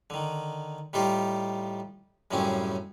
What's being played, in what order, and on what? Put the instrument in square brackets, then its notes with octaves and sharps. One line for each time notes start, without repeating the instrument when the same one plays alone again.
[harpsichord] D3 D#3
A2 G3 D#4 F4 G4
F#2 A2 C#3 G3 C4 C#4